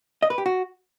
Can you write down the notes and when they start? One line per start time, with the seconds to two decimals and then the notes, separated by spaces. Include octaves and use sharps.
0.22 D#5
0.30 B4
0.38 G4
0.46 F#4